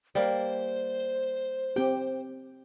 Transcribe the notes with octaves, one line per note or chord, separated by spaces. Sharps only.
G3 A#3 C5
C4 G4 G5